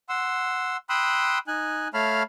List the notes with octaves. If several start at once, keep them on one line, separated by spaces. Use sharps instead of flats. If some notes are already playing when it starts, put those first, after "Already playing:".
F#5 C6 E6
G5 B5 C6 D#6 E6 F#6
D#4 G#5 F#6
A3 C#5 F5 A5 B5 F6